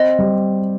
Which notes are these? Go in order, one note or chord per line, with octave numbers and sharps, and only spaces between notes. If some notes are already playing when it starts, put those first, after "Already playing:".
Already playing: C4 D#5
G3